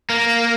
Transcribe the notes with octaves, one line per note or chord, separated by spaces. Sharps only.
A#3